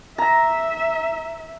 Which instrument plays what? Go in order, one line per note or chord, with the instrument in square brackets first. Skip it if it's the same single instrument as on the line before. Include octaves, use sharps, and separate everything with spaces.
[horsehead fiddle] E5 [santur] A#5